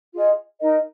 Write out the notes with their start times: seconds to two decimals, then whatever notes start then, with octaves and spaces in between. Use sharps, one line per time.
0.13 F4 G#4 D#5
0.60 D#4 A#4 D#5